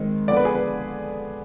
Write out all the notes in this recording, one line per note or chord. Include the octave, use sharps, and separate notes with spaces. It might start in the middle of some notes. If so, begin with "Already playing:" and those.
Already playing: D#3 G#3 C4
D3 F3 B3 D5
B4
G#4
B4